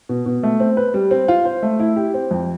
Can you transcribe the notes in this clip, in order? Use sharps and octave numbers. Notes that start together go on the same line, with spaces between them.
B2
B2
A3
C4
B4
G3
C4
F4
C5
A3
E4
G4
C4
F2